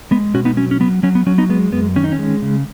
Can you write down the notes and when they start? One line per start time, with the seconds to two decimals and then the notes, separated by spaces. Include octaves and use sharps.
0.11 G#3 B3
0.34 B2 C#4 F#4
0.45 B3 D#4
0.57 F#3 C#4
0.71 C#4
0.80 F#3 B3
1.03 F#3 C#4
1.15 B3
1.26 F#3 C#4
1.38 B3 D#4
1.49 G#3 B3
1.72 F#2 B3
1.96 D#3 C#4
2.04 D#4
2.12 C#4
2.19 G#3
2.42 C#3